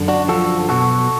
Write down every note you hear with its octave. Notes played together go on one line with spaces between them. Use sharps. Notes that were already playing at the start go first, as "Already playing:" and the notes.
Already playing: F#2 D3
D4 F#4
F#2 D3 F3 F#4 A4
B1 B2 F#4 A4